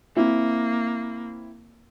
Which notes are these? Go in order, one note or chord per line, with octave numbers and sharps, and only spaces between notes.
A#3 C4 E4